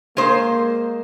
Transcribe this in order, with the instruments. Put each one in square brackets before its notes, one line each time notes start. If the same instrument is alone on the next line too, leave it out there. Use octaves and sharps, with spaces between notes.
[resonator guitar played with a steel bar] G#3 C5 [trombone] A#3